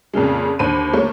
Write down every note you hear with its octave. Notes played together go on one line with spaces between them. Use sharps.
F2 A#2 C#3 G#3
D#2 D3 C5 B5 D#7
A3 A#3 C#5